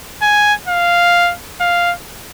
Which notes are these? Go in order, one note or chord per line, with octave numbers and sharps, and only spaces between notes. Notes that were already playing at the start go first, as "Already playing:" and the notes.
G#5
F5
F5